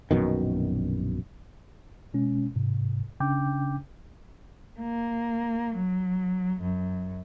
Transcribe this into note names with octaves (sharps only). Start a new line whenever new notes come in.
A#1 F#2 B2 D#3
B2 G#3 C#4
G#2 C3
C#3 C#4 D4 G5 D6 G6
A#3
F#3
F#2